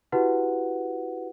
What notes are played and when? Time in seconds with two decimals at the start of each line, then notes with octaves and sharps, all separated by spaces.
0.12 E4 F#4 G4 B4 F#5